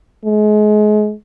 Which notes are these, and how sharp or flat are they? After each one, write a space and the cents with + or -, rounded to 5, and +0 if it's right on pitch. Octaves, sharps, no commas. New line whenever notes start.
G#3 +30